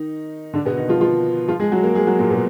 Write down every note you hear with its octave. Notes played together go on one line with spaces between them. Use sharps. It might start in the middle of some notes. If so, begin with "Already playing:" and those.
Already playing: D#3 D#4
D3 D4
B2 B3
D#3 D#4
F3 F4
F3 F4
F3 F4
G#3 G#4
F#3 F#4
A#3 A#4
G#3 G#4
F#3 F#4
A#2 A#3
B2 B3